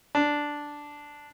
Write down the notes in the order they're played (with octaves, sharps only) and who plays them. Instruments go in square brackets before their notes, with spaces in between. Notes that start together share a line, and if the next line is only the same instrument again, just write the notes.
[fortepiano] D4